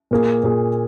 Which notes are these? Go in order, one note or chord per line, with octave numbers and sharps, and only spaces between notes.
A#2 A#3 G#4
A#2 A#3 G#4